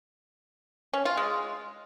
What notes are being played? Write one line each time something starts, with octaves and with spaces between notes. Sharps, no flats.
C#4
F4
G#3